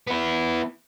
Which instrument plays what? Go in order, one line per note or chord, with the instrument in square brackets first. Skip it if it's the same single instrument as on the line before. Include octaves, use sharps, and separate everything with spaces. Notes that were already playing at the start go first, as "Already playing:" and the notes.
[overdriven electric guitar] B3 E4